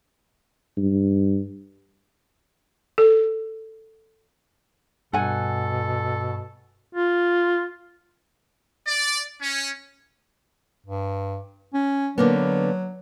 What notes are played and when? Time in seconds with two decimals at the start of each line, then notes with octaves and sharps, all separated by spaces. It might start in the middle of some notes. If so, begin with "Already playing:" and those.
0.77 G2
2.98 A4
5.13 G2 B2 A4 F#5 G#5
6.93 F4
8.88 D5
9.42 C#4
10.86 G2
11.74 C#4
12.18 D3 F#3 A#3 B3